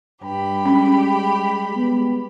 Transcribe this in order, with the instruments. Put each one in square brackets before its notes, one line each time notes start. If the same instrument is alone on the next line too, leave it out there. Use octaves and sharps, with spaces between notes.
[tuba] G2 [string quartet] G3 G4 B5
[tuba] G#3 [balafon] C#4
[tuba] B3